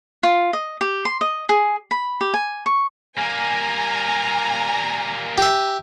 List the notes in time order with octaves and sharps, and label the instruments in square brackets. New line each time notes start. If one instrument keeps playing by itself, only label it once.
[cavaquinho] F4
D#5
G4
C6
D#5
G#4
B5
G4
G#5
C#6
[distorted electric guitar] G3 A#3 [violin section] G#5 A#5
[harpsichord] G4 E5